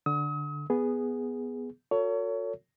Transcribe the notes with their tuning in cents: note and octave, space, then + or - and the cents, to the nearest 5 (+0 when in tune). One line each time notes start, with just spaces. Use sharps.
D3 +0 D#6 +40
B3 +0 G#4 +0
F#4 -25 A4 +40 C#5 +25